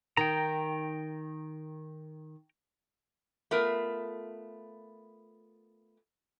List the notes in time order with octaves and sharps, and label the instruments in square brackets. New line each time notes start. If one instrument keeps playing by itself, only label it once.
[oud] D#3 [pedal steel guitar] G5 A#5
[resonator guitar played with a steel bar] A3 B3 F4 A#4